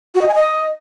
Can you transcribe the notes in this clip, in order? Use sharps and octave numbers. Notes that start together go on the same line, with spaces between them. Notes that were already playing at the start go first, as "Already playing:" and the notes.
F#4
D#5
G#5
D#5